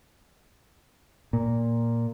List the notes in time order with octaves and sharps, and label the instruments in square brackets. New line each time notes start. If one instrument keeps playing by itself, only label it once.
[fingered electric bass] A#2